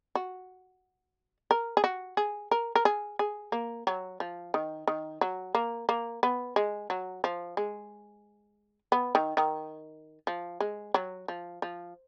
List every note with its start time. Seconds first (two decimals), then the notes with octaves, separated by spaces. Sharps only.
0.15 F#4
1.51 A#4
1.77 G#4
1.84 F#4
2.17 G#4
2.51 A#4
2.75 A#4
2.85 G#4
3.19 G#4
3.52 A#3
3.87 F#3
4.20 F3
4.54 D#3
4.87 D#3
5.21 F#3
5.55 A#3
5.89 A#3
6.23 B3
6.56 G#3
6.90 F#3
7.24 F3
7.57 G#3
8.92 B3
9.15 D#3
9.37 D#3
10.27 F3
10.60 G#3
10.94 F#3
11.28 F3
11.62 F3